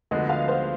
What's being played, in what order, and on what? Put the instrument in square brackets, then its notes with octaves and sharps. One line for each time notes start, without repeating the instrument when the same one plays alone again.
[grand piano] D2 D3 F3 G#3 B3 [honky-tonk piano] D#5
[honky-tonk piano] F5
C5